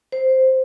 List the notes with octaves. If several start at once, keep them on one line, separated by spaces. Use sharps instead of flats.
C5